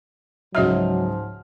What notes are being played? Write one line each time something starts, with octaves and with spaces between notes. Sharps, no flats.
C#2 G#2 F3 F#3 F#4 D#5 E5 F6